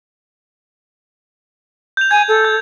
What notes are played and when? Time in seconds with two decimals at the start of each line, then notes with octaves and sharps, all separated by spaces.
1.97 G6 F7
2.11 G#5 G#6
2.28 A4
2.45 G6